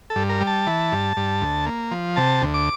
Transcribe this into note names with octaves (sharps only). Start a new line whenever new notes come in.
A4
G2
A#4
G3
A5
E3
G2
G2
D2
A#3
F3
C3 A5
D2
D6